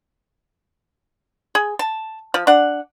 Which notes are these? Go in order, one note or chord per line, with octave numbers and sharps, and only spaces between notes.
G#4
A5
F3
D4 F#5